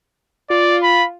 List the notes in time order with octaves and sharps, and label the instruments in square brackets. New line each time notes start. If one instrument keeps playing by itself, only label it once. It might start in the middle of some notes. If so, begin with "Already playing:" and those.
[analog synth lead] F4 [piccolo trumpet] D5
[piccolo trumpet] B5